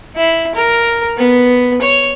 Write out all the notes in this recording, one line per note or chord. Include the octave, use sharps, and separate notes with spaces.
E4
A#4
B3
C#5